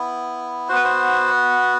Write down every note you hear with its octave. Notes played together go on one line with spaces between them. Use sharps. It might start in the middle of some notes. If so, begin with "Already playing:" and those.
Already playing: B3 E4
B3 F#4 B4 C5
C5